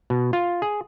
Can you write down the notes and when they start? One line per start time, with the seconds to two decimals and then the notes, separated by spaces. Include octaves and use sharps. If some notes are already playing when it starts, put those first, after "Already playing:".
0.10 B2
0.33 F4
0.62 G#4